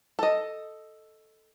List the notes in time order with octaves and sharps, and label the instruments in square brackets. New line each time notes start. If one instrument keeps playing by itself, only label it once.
[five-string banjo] A4 D#5